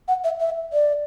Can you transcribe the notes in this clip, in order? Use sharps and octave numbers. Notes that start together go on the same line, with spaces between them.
F#5
E5
E5
D5